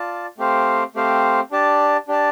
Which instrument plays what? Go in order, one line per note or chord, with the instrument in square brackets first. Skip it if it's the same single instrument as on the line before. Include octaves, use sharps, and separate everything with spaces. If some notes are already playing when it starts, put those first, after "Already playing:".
Already playing: [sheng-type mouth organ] F4 D5 A5
A3 C4 G4 C5 F5
A3 C4 G4 C5 F5
D4 G4 D5 A5
D4 G4 D5 A5